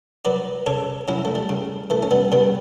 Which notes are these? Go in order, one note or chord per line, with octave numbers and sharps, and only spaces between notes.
F#3 B4 D5
C#3 A4 C#5
F#3 C#4 E4
A3
G3
C#3
E3 A3
C#4
G3 B3
C#3 G3 B3